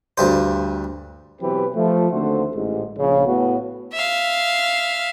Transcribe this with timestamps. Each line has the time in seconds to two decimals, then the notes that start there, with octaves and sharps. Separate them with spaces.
0.18 D2 G2 C5
1.41 B2 E3 F#3 C4 G4 B4
1.75 F3 A3
2.12 D#2 D3 A3 C4 F#4 C5
2.54 A1 G#2
2.98 A#1 C#3
3.27 A2 B3 F#4
3.93 E5 F5